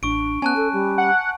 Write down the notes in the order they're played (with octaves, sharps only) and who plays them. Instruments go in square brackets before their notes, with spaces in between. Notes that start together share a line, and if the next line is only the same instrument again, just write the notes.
[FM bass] A1 [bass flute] D4 [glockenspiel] C#6 D7
[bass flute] B3 [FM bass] C#4 [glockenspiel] G#5 A5 F#6
[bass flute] A4
G3
[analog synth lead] F#5